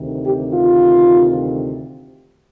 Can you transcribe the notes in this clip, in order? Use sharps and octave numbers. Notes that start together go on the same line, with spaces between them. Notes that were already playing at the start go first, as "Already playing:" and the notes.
Already playing: D2 C3 D#3
G4
F4